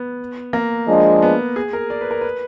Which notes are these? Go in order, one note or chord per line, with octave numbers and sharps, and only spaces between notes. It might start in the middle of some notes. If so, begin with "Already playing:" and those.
Already playing: B3
A#3
F3 G#3 D4 G#4 D#5
B3
G#4
A#4
D5
B4
A#4
B4